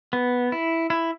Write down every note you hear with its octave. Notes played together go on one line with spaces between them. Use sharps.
B3
E4
E4